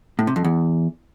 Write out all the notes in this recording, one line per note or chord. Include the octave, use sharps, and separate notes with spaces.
A2
C3
F2
E2